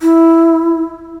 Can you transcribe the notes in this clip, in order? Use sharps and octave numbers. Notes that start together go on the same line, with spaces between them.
E4